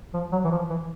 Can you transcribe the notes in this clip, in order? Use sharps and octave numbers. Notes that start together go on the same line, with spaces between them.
F3
F#3
E3
F3
E3